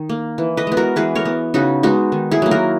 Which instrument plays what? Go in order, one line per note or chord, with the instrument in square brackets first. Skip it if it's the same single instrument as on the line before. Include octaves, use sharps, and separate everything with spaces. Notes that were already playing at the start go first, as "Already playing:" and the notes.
Already playing: [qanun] D#3
A#3
E3
B4 D#5
G#3 B3
F#4 A#4
E3 G#4 B4
A#4 C#5
B3
C#3 D#4 F#4
G#3 B3 D#4 F#4
D#3
E4 G#4
F#3 A#3
F#4 A#4